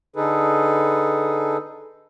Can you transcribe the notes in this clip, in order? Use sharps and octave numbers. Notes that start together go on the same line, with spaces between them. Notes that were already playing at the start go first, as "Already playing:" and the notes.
D3 D#4 G#4 A4 B4